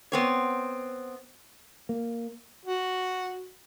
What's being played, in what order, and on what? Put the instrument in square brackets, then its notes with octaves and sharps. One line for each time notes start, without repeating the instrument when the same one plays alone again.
[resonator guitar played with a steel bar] B3 C4 C#5
[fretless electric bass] A#3
[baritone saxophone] F#4